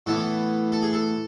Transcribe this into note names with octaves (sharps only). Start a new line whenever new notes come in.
A2 E3 B3 A4
A4
G#4
A4